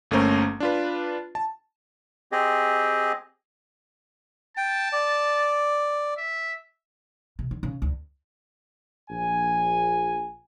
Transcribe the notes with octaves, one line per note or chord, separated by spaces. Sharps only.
G1 A3 A#3 C#4 C5 A#5
D4 F4 B4
A5
C4 G4 G#4 D#5
G5 A5
D5
E5
C3
D3
C#3
D2
A#1 G#5